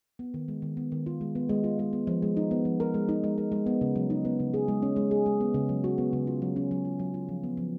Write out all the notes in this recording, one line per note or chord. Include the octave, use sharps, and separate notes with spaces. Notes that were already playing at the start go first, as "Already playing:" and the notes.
B3
D#3
G#3
D#3
B3
D#3
F4
G#3
B3
G#3
F4
G#3
B3
F3
G#3
D#4
B3
F3
A#4
G#3
D#4
G#3
A#4
G#3
B3
C#3
F#3
D#4
B3
C#3
G#4
G#3
C#4
G#3
G#4
G#3
B3
C#3
F#3
F#4
B3
C#3
F4
F#3
C#4
F#3
F4
F#3
F4
F3
B3
F3